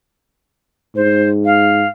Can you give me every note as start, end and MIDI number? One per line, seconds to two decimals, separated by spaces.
0.96 1.85 44
0.96 1.29 72
1.45 1.88 77